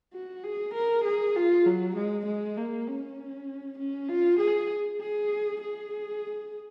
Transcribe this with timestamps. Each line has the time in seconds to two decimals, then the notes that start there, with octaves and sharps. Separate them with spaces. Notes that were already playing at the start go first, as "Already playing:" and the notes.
0.14 F#4
0.44 G#4
0.74 A#4
1.05 G#4
1.36 F4
1.66 F#3
1.96 G#3
2.26 G#3
2.57 A#3
2.87 C#4
3.79 C#4
4.09 F4
4.40 G#4
5.00 G#4
5.61 G#4